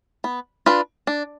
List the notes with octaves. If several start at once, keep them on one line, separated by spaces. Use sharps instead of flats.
B3
D4 F4 B4
D4